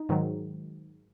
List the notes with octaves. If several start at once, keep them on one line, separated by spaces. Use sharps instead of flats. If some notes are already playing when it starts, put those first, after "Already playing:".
Already playing: D#4
G#2 D#3 F#3